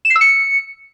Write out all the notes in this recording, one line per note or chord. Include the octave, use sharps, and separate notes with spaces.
E7
C7
E6
C#7